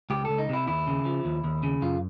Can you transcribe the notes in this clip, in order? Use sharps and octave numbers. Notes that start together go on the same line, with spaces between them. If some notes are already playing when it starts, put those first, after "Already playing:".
C#2 G4
C#2 A4
D#4
C3 E4
D#2 E4
C#3
F3
D#2
D#2
C#3
F#2 F4